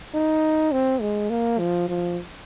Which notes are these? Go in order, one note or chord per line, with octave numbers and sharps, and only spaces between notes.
D#4
C4
G#3
A#3
F3
F3